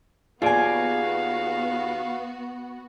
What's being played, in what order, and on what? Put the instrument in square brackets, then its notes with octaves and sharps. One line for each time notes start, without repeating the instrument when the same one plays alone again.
[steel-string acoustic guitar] D#2 G#5 [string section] B3 F#4 [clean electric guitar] F4 G#4 D5 [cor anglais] F5